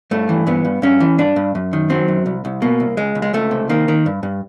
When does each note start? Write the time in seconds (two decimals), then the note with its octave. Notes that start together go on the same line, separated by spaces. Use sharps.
0.11 G2 A3
0.29 E3
0.47 G2 B3
0.65 G2
0.82 G2 C#4
1.00 E3
1.18 G2 D4
1.36 G2
1.55 F#2
1.73 D#3
1.90 F#3 C4
2.08 F#2
2.26 C2
2.45 C2
2.62 B2 A#3
2.80 C2
2.97 C#2 G#3
3.15 C#2
3.22 G#3
3.33 C#2 A3
3.51 C3
3.69 D#3 A#3
3.88 D#3
4.06 G2
4.23 G2